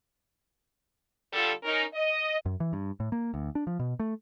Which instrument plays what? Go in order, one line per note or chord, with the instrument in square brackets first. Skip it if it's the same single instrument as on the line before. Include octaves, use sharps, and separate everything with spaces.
[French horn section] D3 G3 F4 A4
C#4 D#4 A#4
D#5
[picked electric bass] F#2
E3
G2
A2
A#3
D2
D4
F3
B2
A3